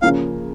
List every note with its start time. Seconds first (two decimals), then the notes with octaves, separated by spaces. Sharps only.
0.02 C#3 F3 A#3 C#4 F5